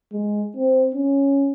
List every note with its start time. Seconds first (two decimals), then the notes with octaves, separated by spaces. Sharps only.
0.12 G#3
0.57 C4
0.94 C#4